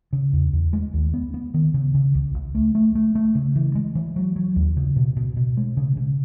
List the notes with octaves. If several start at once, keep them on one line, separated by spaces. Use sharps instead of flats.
C#3
E2
E2
G#3
D#2
B3
B3
D#3
C#3
C#3
C#2
C#2
A3
A3
A3
A3
C#3
E3
G#3
E3
F#3
F#3
D#2
C#3
B2
B2
B2
G#3
C#3
C#3